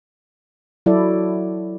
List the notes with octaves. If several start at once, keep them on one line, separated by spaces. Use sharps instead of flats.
F#3 E4 F#4 A4 D5